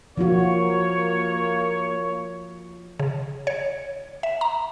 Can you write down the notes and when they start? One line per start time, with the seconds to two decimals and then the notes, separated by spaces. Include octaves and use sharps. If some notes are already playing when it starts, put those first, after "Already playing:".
0.17 F3 A#3 F4 F#4 C#5
3.00 C#3
3.47 C#5
4.23 E5
4.41 A#5